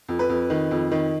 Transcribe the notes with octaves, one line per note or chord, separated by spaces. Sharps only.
F2
B4
F2
D#3
F2
D#3